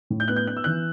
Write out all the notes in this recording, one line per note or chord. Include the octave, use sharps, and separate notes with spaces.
A2
G6
B3 F#6
G6
B3 F#6
E6
E3 F#6